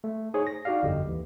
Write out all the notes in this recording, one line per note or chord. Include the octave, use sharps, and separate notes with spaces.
A3
D#4 G#4 C5 C#5
A#6
D#4 F#4 G4 D5 F5
G1 F2 G4 A4 D#5
D#2 E3